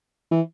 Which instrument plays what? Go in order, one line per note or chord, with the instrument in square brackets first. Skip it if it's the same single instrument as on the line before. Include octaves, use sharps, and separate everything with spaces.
[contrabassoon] E3